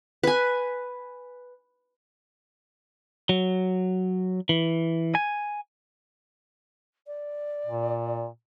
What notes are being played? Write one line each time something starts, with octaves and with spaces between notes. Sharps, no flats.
B4 G#5
F#3
E3
G#5
D5
A#2